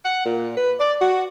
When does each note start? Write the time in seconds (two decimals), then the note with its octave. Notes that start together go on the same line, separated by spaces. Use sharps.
0.03 F#5
0.25 A#2
0.57 B4
0.80 D5
1.00 F#4